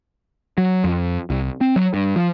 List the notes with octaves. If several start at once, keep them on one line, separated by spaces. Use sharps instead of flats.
F#3
F2
C2
C4
F#3
G2
F3